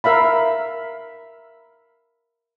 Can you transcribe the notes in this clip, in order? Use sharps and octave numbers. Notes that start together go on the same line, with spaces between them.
A#4 E5 F5 B5